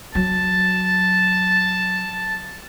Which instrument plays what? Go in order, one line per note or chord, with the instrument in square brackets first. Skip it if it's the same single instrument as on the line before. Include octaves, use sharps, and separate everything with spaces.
[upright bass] F#3 [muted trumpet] A5